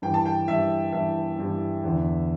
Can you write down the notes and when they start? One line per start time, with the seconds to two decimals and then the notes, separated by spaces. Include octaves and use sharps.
0.02 G2 E3 G5
0.14 A5
0.25 G5
0.48 G2 E3 E5
0.93 G2 E3 E5
1.38 G2 E3
1.84 E2 D3